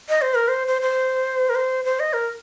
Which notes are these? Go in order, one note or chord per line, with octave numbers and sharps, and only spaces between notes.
D#5
C5
A#4
C5
C5
C5
A#4
C5
C5
D#5
A#4